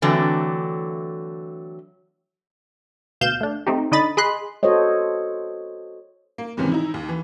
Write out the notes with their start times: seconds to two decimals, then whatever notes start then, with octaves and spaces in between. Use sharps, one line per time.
0.02 D3 E3 F#3 A3 C4
3.21 D2 B2 F5 G6 E7
3.41 A3 D4
3.67 A3 C4 D#4 G4
3.92 D3 D#4 D#5 B5 A6
4.17 G#4 D#5 B5 C6 F#6
4.63 F#4 A4 C5 C#5 D#5
6.38 A#3
6.57 F2 G#2 C3 D#3 E3 C#4
6.72 D#4 E4
6.94 D#2
7.09 E3